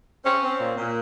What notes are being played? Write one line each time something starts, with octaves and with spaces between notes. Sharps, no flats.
C4 C#4
C4
A#2
A#2